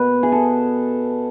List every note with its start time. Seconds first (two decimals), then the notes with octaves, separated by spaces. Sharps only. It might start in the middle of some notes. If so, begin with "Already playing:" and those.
Already playing: B2 B4
0.23 G#4
0.32 A4